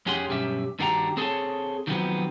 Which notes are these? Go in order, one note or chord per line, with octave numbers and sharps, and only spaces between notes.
F2 C#4 G4 G#4 F#5 C6
B1 G2 C#4 G4 E5
G2 D#3 D4 F#4 G4 A#5
C4 G#4 A4 B4 C#5 A5
D#3 F3 F#3 A3 B3 C4